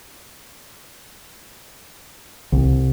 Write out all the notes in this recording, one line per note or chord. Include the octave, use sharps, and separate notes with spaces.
C2